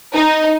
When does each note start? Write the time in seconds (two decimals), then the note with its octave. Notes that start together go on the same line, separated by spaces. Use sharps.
0.13 D#4